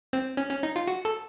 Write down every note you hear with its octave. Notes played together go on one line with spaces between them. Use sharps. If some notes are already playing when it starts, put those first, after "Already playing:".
C4
C#4
C#4
D#4
F4
F#4
A4